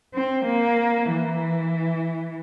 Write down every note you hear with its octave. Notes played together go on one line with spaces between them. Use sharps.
C4
A#3
E3